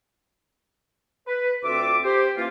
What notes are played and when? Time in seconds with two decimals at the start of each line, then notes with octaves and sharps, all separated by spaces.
1.27 B4
1.63 D2 C4 F4 E5 D6
2.04 G4 C5
2.36 E3 A#3 C#4 F4